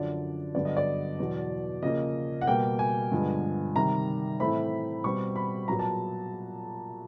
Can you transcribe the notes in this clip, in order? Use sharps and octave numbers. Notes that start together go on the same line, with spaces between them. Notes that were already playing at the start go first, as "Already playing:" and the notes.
Already playing: F#2 D3 F3 D5
G2 D3 F#3 B3 D5
D#5
D5
E2 B2 F#3
C#3 F3 A#3 D#5
F#5
B2 G3 A#3 G5
G#5
G2 D3 F3 G#3 B3
C3 D#3 G3 A#5
A2 E3 A3 C4 B5
B2 G3 C4 C#6
B5
A#2 F#3 B3 A#5
A5